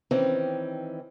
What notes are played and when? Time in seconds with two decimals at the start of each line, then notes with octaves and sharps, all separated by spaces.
0.11 D#3 E3 C4 C#4